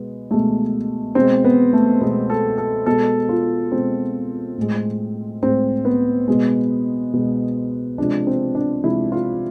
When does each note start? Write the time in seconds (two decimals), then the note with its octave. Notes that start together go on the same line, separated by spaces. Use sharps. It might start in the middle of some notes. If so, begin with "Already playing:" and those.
Already playing: B2 G#3 B3
0.31 B2 G#3 A3
1.15 B2 G#3 C4
1.44 B3
1.73 A3
2.01 B2 G#3 B3
2.30 A4
2.58 A4
2.86 B2 G#3 A4
3.29 F4
3.72 B2 G#3 C4
4.57 A2 G#3
5.42 A2 G#3 C4
5.85 B3
6.28 B2 G#3
7.13 B2 G#3
7.98 C3 F3 G#3 D4
8.27 C4
8.55 D4
8.84 C3 F3 G#3 E4
9.12 F4